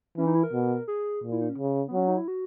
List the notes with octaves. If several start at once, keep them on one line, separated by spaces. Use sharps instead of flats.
E3 C#4
D#4
E4
A#4
B2
G#4
A#2
E4
D#4
C#4
C#3
B3
F#3 C#4
D#4
E4
F#4